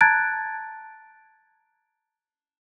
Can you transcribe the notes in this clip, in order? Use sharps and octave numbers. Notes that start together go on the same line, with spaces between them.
A5 A#5 F#6 G#6 A6 D7